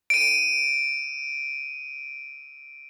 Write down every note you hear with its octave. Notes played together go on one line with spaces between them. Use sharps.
D7 D#7